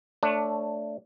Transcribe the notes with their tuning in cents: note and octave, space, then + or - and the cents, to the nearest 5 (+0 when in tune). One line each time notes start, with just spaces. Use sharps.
A3 +15 D4 +0 C#5 -15